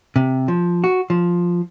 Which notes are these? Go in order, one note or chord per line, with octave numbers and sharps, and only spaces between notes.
C3
F3
F#4
F3